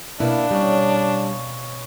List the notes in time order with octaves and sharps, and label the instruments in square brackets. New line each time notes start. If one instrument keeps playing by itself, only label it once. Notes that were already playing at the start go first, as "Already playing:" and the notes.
[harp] B2 [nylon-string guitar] A#3 E4 [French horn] D4 [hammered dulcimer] B4 F5
[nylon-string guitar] G3 [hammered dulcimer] C#4 D#5